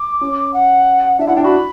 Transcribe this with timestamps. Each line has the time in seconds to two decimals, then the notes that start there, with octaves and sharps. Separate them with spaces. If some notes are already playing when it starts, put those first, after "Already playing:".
Already playing: D6
0.21 C#4
0.54 F#5
1.19 D4 E5
1.27 E4 F#5
1.36 D4 G5
1.44 F#4 B5